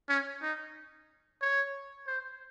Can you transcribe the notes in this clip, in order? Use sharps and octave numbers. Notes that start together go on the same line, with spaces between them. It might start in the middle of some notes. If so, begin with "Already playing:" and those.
C#4
D#4
C#5
C5